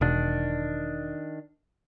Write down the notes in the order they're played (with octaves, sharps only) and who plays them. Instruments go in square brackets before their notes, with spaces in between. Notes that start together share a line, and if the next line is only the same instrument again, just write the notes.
[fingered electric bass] E1 [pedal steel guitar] D#3 D4